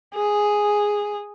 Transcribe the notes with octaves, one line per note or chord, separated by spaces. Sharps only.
G#4